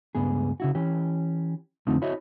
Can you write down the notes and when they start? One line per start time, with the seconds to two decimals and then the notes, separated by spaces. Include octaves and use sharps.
0.15 C#2 G2 B3 G#4
0.60 C#3 E4 F#4
0.75 E3 C#4 G4
1.87 F2 D3 A3 C4 D#4 F4
2.02 E4 F#4 C#5 D#5 E5